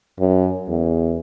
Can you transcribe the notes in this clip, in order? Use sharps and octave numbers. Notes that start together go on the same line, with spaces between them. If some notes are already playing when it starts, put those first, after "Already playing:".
F#2
E2